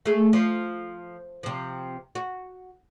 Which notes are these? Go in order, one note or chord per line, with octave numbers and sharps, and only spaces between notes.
A3 G#4
F3
C3 F3
F#4